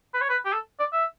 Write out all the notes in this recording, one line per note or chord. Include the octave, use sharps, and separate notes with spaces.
B4
C#5
B4
G4
A4
D5
E5